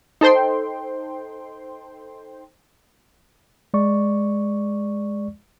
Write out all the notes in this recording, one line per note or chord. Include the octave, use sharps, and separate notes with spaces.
D#4 A4 C5 G5 C6
G#3 D5 C#6